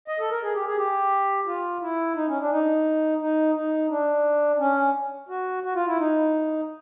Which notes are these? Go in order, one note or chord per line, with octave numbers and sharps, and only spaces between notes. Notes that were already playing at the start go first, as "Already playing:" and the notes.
D#5
A4
A#4
G#4
G4
G#4
G4
F4
E4
D#4
C#4
D4
D#4
D#4
D#4
D4
C#4
F#4
F#4
F4
E4
D#4